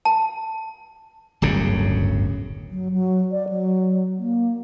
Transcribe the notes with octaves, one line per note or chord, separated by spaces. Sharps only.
A5
D1 G1 F#2 C#3
F#3
F#3
D5
F#3
A#3